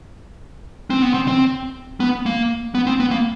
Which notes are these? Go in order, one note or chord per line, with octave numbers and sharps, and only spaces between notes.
C4
B3
C4
C4
B3
A#3
B3
C4
B3
A#3